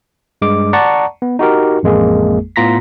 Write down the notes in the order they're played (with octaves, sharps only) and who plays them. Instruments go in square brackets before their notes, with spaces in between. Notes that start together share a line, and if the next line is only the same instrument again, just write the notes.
[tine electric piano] G2 G#3 D6
D5 F#5 A5 A#5 C#6
B3
D#4 F#4 G4 A#4
A1 F2 G#3 A#3 G#4
A2 B3 F4 A#5 A#6 B6